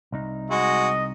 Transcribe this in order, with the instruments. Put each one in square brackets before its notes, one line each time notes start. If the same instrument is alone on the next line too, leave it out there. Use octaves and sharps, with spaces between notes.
[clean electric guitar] C2 D#4
[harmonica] G#3 F#4 [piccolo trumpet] D#5